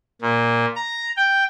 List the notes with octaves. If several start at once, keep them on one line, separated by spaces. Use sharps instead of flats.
A#2
A#5
G5